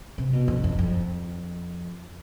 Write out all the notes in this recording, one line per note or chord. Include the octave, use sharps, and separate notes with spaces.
C3
B2
F2
F2
F2